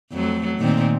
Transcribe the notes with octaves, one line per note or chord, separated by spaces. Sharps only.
F2 F#3 A3
A#2 D#3 C4